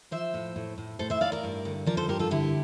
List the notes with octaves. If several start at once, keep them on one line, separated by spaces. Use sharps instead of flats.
F3 C5 E5
A2
A2
A2
A2 A4 C5
C5 E5
A2 D5 F5
A#4 D5
G2
D3
F3 A#4 D5
A4 C5
G2 G4 A#4
F4 A4
D3 E4 G4